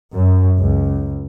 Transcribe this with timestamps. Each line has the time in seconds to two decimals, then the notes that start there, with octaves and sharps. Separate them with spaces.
0.14 F#2
0.59 C#2